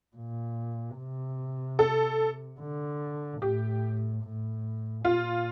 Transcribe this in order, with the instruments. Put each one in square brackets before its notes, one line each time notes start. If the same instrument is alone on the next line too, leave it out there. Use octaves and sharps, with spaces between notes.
[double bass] A#2
C3
[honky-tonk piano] A4
[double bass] D3
[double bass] A2 [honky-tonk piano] G4
[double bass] A2
[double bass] A#2 [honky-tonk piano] F4